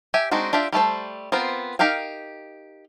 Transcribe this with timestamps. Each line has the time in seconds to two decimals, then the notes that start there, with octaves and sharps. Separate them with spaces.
0.14 G4 E5 G#5
0.31 G#3 C4 D4 D#4 F#4
0.53 D4 F4 G4 E5
0.73 G3 A3 A4 C5
1.32 B3 C4 F4 A#4 C5
1.79 D#4 G4 A#4 F5 G5